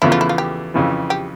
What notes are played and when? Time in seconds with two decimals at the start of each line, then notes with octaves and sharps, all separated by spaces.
0.02 E2 C#3 F3 A3 E4
0.12 F4
0.21 E4
0.29 F4
0.38 G4
0.74 F2 C#3 E3
1.10 G4